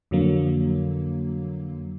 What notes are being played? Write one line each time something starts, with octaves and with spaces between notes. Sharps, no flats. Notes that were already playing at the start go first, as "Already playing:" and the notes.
F2 D3 F#3 A#3